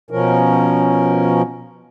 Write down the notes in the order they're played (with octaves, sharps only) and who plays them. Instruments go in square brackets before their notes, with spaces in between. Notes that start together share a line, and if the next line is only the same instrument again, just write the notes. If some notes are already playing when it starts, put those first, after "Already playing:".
[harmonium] B2 F3 C#4 A#4